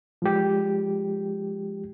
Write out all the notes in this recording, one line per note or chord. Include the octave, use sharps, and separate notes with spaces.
F3 G#3 G4